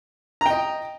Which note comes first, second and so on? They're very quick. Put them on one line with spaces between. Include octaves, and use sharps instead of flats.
A#5 G5 D#5